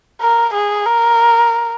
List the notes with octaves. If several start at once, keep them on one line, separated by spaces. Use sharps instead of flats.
A#4
G#4
A#4